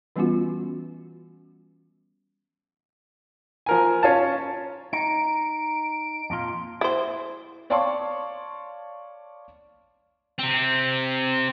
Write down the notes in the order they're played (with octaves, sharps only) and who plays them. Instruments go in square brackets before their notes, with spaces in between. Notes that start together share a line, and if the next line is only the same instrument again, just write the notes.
[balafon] E3 G3 B3 C#4 F4 F#4
[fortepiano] F3 A#4 G#5
C#4 F4 A5
[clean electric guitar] D#4 [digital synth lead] D7
[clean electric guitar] F2 A#2 F4
[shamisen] E4 C5
[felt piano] C#5 D5 F5 A5 C6 C#6
[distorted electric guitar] C3 C4